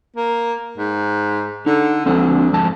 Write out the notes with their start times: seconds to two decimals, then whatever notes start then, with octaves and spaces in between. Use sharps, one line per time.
0.16 A#3
0.78 G#2
1.66 D3 D#4
2.06 D2 F3 C4 D4
2.53 F2 G#2 A5